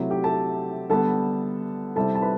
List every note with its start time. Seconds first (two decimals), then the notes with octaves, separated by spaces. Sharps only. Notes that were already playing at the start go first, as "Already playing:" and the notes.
Already playing: C3 F#3 A3 E4
0.10 G4 G5
0.24 A4 A5
0.90 D3 G3 B3 A4 A5
1.96 C3 G3 C4 E4 A4 A5
2.15 A5
2.22 B4 B5